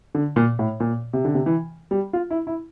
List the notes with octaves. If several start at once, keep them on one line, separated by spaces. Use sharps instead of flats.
D3
A#2
A2
A#2
C3
D3
C3
E3
G3
F4
E4
E4